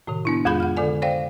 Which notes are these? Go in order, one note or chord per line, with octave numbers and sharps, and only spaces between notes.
A2 C3 D#3
B3 D4 E4
F2 G#3 F4 G#4 B5 G6
F#5 F6
D3 A4 D5 G#5
C5 D5 F5 G5